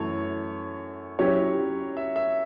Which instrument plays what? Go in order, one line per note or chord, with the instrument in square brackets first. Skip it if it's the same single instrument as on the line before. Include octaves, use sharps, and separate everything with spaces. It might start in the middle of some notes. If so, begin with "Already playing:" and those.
Already playing: [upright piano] F#2 E3 A3 [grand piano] C#5
[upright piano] F#3 C#4 E4 G4 [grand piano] C#5
[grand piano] E5
E5